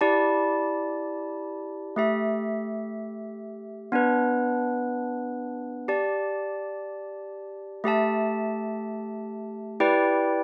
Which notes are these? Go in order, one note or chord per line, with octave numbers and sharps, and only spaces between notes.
E4 G4 D5 A5
A3 G4 E5
B3 D4 B4
G4 D5 A5
A3 G4 E5 A5
E4 G4 B4 D5 G5